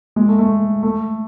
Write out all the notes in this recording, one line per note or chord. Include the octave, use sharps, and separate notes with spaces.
G#3
A3
A3
A3